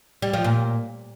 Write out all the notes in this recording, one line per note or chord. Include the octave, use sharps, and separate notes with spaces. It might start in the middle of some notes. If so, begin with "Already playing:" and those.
G3
F3
A#2